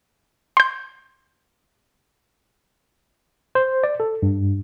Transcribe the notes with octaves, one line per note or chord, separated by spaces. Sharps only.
C6 G6
C5
D5
A4
G2